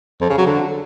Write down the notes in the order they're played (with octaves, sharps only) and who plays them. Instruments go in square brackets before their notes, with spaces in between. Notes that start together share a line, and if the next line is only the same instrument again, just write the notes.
[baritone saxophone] F2
C#3
F#3
D3